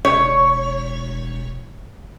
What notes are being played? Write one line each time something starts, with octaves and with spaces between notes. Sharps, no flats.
E1 C#5